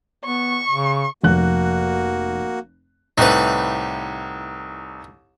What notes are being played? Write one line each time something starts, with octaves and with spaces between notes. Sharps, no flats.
B3 C#6
C#3
F1 A#3 F#4 F#6
C2 A2 D#4 B4